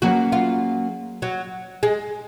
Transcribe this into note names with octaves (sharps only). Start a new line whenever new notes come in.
F#3 A#3 C#4 F#4 G#4 B4
F4
F#3
G#3